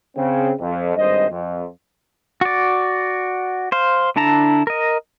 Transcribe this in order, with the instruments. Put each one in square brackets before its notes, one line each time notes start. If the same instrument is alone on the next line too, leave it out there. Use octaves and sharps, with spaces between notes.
[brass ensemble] C#3 C4
F2
G#1 G2 C5 D#5
F2
[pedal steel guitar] F#4 D5
C5 F5
D3 D4 E4 A5 A#5
A#4 D#5